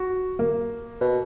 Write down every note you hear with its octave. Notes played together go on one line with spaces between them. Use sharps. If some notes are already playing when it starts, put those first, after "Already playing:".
Already playing: F#4
A#3
B2